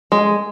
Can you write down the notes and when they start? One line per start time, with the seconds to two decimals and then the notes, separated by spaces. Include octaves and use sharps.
0.12 G#3